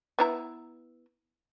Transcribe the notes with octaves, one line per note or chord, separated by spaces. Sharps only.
B3 E4 A#5